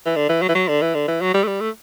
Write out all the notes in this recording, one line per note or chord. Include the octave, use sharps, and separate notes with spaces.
E3
D3
E3
F#3
E3
F#3
D3
E3
D3
E3
F#3
G3
A3
G3
A3